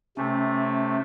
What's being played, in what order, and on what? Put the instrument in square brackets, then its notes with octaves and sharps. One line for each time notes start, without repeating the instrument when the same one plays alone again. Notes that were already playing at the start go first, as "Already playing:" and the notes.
[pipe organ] C3 A3 [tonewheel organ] C#4